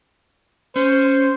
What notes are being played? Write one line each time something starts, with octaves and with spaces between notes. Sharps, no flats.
C#4 C5